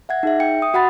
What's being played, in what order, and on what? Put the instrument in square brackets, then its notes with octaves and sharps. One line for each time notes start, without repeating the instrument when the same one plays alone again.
[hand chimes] E5 F#5 G#6
D#4 G#4 E5
E5 G5 C#7
D#6
F#4 F#5 B5 A6